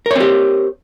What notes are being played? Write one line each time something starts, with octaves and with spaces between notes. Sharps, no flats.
C4 G4 A#4 C#5